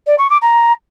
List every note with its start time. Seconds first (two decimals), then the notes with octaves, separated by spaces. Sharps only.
0.07 D5
0.18 C#6
0.30 D6
0.42 A#5